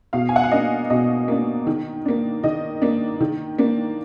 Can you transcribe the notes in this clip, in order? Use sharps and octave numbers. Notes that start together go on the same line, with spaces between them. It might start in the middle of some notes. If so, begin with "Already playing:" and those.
B2 F5
G#5
F#5
F5
A#3 D4 D#5
B2 D#5
A#3 D4
D#3
A#3 D4
D#3 D#5
A#3 D4
D#3
A#3 D4